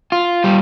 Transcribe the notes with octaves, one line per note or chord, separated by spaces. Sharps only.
F4
G3